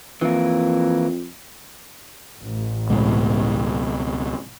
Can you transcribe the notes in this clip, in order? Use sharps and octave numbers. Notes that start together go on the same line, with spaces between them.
F2 E3 A#3
A1
C#2 B2 G#3